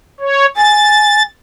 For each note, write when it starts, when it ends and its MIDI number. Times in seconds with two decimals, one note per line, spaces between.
0.20 0.46 73
0.57 1.21 80
0.57 1.23 93